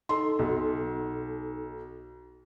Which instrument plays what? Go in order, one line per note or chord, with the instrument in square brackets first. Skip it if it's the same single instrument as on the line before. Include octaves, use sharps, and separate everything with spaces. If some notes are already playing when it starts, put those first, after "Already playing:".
[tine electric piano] D#4 A4 [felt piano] C6
[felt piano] B1